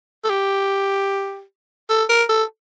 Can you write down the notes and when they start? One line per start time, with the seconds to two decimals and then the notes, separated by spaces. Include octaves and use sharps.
0.25 A4
0.30 G4
1.90 A4
2.09 A#4
2.29 A4